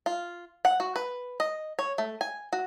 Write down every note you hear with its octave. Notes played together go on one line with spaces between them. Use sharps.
F4
F#5
F#4
B4
D#5
C#5
A3
G#5
F#4